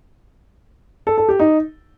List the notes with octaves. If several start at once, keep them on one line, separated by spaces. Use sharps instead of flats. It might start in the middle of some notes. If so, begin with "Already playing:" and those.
A4
A4
G4
D#4